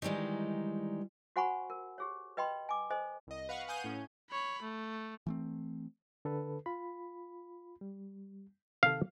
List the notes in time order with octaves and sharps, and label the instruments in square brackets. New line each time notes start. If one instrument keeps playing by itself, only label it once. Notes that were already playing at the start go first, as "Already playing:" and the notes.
[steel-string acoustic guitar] D#3 E3 G3 G#3 D#4
[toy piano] F#4 C5 F#5 G#5 B5 C#6
A#4
G4 G#4 C#5
B4 D#5 G5 B5 C6
G#5 D6
A4 C5 D#5 G#5
[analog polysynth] C2 D#5
B4 F5 F#5 C#6
F5 F#5 G#5 D#6 G6 D#7
A2 C#4
[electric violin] C#5 B5
A3
[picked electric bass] E3 A3 C4
[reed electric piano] D3 A4 B4
F4 B5
G3
[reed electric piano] C3 D#3 A4 [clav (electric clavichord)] F5